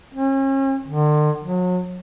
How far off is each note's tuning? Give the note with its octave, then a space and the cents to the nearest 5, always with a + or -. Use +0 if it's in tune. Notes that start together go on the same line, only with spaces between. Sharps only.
C#4 -40
D3 +40
F#3 -35